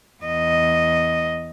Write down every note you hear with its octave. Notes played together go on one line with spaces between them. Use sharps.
E2 D#5